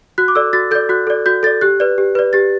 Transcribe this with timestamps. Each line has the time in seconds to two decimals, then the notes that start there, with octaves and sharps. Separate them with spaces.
0.18 F#4 F#6
0.28 D6
0.35 A4 D5 E6
0.53 F#4 A6
0.71 A4 G6
0.75 D5
0.89 F#4 F#6
1.07 A4 D5
1.26 F#4 G6
1.43 A4 D5 A6
1.61 G4 F#6
1.80 B4 D5
1.98 G4
2.15 B4 D5
2.33 G4 A6